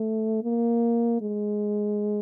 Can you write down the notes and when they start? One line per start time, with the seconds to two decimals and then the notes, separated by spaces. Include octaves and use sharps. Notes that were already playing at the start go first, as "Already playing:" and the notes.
Already playing: A3
0.43 A#3
1.21 G#3